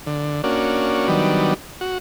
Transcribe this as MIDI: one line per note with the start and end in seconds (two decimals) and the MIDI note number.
0.07 0.42 50
0.44 1.08 58
0.44 1.08 61
0.44 1.08 62
0.44 1.08 66
1.08 1.54 51
1.08 1.54 54
1.08 1.54 55
1.08 1.54 59
1.08 1.54 62
1.81 1.98 66